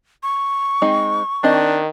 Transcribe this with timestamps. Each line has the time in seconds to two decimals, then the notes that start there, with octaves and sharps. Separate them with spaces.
0.23 C#6
0.82 G#3 C4 D#4
1.44 D#3 C4 D4 D#5